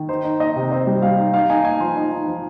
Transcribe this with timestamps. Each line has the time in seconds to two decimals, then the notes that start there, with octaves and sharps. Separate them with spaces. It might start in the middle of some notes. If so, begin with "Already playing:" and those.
Already playing: D#3
0.09 D#4 C5
0.24 D#4
0.40 D#4 D#5
0.56 C3
0.71 C4 D#5
0.87 G3
1.02 G3 F5
1.18 D#4
1.34 D#4 F5
1.50 D#4 G#5
1.65 D#4 G#5
1.80 F3 C6
1.96 D#4
2.12 D#4
2.28 F3